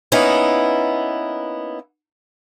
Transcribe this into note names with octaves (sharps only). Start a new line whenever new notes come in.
A#3 B3 C#4 D#4 E4